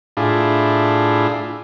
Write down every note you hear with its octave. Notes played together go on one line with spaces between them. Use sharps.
A2 D4 E4 F4 G#4